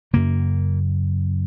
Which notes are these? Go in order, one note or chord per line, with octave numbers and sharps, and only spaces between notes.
F#2 C#3 A#3